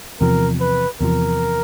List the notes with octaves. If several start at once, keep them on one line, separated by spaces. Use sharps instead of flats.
E2 C3 F3 A#4
B4
E2 C3 F3 A#4